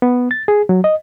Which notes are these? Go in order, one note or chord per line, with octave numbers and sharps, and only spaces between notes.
B3
A6
G#4
F#3
D#5